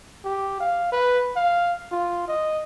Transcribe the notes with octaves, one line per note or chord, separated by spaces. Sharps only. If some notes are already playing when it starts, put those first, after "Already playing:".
G4
F5
B4
F5
F4
D#5